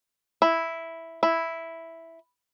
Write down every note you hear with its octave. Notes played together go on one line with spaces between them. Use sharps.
E4
E4